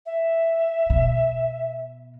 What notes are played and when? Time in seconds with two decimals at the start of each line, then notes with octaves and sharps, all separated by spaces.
0.06 E5
0.90 B2